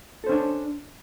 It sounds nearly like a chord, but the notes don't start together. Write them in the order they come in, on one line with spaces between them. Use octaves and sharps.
A4 C5 C#4 D4